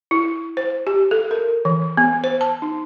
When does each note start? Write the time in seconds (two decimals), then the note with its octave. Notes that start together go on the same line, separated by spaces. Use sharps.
0.11 E4
0.57 C5
0.87 G4
1.11 A4
1.31 A#4
1.65 E3
1.97 B3
2.24 C5
2.41 A5
2.62 D#4